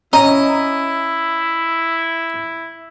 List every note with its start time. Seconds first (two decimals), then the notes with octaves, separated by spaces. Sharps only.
0.13 C#4 E4 D#5 A#5